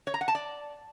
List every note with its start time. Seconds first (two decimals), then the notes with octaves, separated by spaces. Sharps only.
0.07 C#5
0.14 A#5
0.21 F#5
0.28 A5
0.35 D5